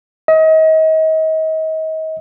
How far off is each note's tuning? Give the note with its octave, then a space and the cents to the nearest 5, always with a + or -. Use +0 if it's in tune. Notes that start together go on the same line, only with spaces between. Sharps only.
D#5 +35